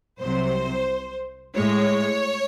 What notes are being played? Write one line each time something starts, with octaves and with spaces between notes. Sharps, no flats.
C2 C3 F#3 C5
A2 G#3 C#5